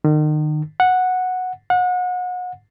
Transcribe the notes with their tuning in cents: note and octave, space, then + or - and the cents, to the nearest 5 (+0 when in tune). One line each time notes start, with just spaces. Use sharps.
D#3 -35
F#5 -10
F#5 -35